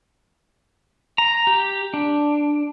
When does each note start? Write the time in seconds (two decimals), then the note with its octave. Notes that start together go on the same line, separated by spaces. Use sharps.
1.18 A#5
1.47 G4
1.94 D4